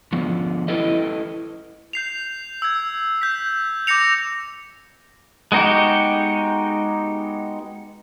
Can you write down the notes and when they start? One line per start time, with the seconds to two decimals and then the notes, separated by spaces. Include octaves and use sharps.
0.13 D3 F3 B3
0.68 E4 A4 B4 D#5
1.93 G6 C7 F7
2.62 E6 G#6
3.22 G6 B6
3.87 D6 G6 A#6 C#7 F7
5.52 G#3 B3 D#4 F#4 G4